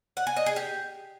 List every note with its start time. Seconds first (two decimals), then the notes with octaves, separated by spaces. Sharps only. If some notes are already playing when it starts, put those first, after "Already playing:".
0.17 F#5
0.27 G#5
0.37 D#5
0.46 G#4
0.56 G4